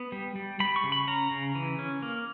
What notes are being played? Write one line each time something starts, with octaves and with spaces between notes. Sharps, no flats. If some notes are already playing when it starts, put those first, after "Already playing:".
Already playing: B3
G3
G3
G3 B5
C#6
C#3
B5
C#4 A#5
C#3
E3
C#4
A#3